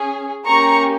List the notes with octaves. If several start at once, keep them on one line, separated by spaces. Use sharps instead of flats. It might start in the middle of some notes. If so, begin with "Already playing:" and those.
Already playing: C#4 G#4
A#3 C#4 G4 A#5 C#6